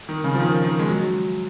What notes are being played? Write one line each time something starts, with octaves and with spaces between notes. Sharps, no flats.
D#3
C#3
F3
D#3
D#3
G#3
F#3